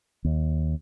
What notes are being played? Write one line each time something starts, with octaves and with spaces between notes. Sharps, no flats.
D#2